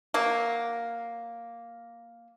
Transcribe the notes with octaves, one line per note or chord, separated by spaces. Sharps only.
F#3 A#3